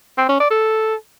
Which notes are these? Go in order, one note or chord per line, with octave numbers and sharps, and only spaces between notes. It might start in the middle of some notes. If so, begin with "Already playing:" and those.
C4
C#4
D5
A4